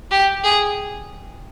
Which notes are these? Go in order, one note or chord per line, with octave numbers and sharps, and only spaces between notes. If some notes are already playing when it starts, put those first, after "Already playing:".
G4
G#4